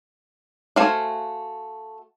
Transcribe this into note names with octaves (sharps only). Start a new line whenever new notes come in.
A3 F#4 C5 F5 G#5